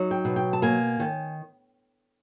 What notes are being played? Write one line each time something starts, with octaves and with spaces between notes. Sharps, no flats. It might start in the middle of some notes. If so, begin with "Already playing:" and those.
Already playing: F#3 D#4
G5
B2
G5
A5
A#3 G#5
D#3